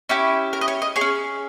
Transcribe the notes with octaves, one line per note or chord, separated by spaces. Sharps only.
C#4 E4 G4
A#4
D#5
C#5
D#5
G#4 C#5
C#4